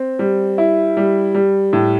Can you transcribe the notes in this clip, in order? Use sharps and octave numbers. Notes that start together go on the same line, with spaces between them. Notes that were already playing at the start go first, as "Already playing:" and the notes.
Already playing: C4
G3
E4
G3
G3
A2